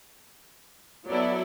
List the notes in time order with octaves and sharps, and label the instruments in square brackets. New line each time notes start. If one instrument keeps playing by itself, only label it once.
[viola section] F#3 B3 E4 [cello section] A4 D5